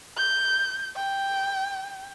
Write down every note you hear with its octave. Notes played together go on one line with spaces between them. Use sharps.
G6
G5